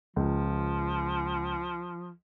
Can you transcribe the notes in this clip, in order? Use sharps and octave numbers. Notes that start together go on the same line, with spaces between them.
C#2 F3